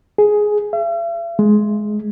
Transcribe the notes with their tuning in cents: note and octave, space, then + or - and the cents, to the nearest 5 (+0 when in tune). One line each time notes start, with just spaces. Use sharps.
G#4 +10
E5 +45
G#3 +15